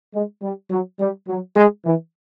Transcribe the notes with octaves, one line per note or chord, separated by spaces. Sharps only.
G#3
G3
F#3
G3
F#3
G#3
E3